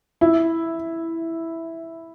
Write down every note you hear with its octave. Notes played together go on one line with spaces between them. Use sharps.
E4